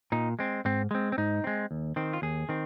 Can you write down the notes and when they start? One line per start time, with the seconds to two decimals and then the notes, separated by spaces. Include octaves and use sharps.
0.12 A#2 D#4
0.39 G#3 C4
0.65 G#2 C4
0.91 G#3 C4
1.12 C4
1.18 G#2 D#4
1.44 G#3 C4
1.71 D#2
1.96 D#3 C4
2.13 F4
2.22 D#2 G#4
2.49 D#3 C4